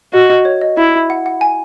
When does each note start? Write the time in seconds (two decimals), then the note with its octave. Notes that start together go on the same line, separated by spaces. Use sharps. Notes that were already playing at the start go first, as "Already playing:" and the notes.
0.13 F#4 D#5
0.30 D#5
0.45 C#5
0.61 D#5
0.77 E4 E5
1.10 F#5
1.26 F#5
1.41 G#5